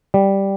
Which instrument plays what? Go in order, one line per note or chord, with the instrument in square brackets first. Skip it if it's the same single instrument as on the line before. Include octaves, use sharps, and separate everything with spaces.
[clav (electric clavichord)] G3